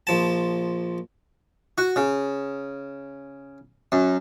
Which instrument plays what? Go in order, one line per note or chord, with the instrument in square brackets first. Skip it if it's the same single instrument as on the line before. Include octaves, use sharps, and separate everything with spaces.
[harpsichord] A#1 F3 A5
F#4
C#3
F#2